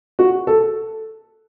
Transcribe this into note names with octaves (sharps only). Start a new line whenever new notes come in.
F#4
A4